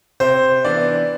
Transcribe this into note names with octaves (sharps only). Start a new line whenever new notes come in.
C3 C5
E3 B3 D4 D5